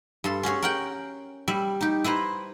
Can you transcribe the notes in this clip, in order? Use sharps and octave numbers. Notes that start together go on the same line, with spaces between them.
G2 A4 C6
C#4 F#4 G#4 C#5
A#4 F#5 G5
G3 E5
D#4 G4
E4 B4 C5 A#5